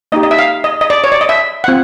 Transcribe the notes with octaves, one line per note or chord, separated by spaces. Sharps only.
A#3 D#4 G4 D#5
D#5
E5
F5
D#5
D#5
D5
C#5
D5
D#5
E5
F#5
C4 F4